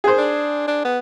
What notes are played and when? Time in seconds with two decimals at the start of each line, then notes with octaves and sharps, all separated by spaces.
0.04 G#4 C5
0.18 D4
0.68 D4
0.85 B3